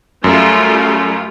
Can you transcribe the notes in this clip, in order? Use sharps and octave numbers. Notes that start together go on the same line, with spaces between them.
F#2 G3 A3 F4